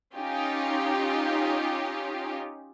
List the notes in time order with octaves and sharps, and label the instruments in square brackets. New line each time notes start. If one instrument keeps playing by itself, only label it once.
[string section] C#4 D#4 F4 G4